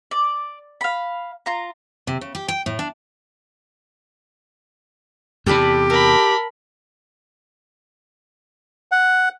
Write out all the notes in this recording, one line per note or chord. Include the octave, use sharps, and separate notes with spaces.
D5
F5 B5
F4 A#5
C3
C#3
G4
G5
A2
D4
E2 C3 G4 A4 D5 B5
A4 A#4 B5
F#5